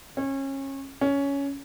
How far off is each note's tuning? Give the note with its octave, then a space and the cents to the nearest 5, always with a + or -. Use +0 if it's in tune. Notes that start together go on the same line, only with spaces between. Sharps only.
C#4 -30
C#4 +10